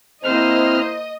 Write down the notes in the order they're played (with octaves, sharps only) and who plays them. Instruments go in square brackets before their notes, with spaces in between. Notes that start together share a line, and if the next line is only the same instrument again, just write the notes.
[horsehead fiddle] A#3 C5 [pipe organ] C4 F6 [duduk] E4 [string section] D#5